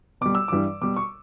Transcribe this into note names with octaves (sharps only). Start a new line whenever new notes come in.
B2 G3 D6
E6
G2 E3 G3 D6
B2 G3 D6
C#6